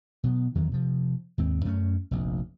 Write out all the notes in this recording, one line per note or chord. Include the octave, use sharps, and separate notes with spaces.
B2 F#3 B3
E2 D#3 F#3
C3 F3
D#2 G#2 C4
F#2 A3 B3 C#4
F1 A#1